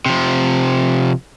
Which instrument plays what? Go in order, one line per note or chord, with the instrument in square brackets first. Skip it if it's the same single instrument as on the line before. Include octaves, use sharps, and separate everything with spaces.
[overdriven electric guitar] C3 F3